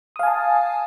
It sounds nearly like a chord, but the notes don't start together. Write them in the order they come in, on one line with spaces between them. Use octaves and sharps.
D#6 F5 G#5 A5